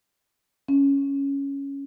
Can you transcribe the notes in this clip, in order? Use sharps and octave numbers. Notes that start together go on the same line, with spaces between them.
C#4